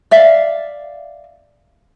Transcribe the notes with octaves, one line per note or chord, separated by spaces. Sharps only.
D5 E5 F5